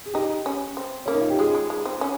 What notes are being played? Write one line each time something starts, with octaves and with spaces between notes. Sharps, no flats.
G#4
D#4 G4
C#4
C4
A#3 C#4
D#4
F4
G4
G#3 G#4
G#3
G#3
C4
C#4